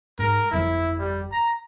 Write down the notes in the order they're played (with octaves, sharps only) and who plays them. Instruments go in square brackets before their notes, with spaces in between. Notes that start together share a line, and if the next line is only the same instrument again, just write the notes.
[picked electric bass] G#2 [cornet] A#4
[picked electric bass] G1 F2 F3 [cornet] E4
[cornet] G3
A#5